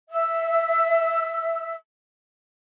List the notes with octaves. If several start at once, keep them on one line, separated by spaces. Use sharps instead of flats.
E5 E6